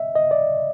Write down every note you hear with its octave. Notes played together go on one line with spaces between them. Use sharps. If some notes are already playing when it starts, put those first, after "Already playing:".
Already playing: D#5 E5
D#5
D5